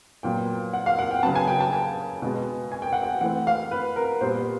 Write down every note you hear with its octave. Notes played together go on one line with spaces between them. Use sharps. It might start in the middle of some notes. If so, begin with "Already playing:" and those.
A#2 F#3 B3 G5
F#5
F5
F#5
G5
C#3 F#3 B3 A5
G#5
G5
A5
G#5
B2 G#3 B3
G#5
G5
F#5
G5
E3 A3 C4 F#5
F5
B4
A#4
A#2 G3 B3 C5